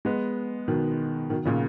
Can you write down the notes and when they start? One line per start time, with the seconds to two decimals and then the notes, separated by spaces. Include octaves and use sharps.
0.05 G#3 B3
0.68 B2 D#3
1.30 B2 D#3
1.45 A#2 C#3